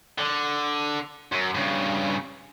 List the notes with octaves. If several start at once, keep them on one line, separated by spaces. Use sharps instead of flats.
D3
F#2
G2 C#3